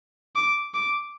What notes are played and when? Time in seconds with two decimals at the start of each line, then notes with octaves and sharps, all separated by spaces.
0.36 D6
0.74 D6